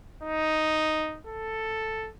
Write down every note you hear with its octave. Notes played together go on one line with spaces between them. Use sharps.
D#4
A4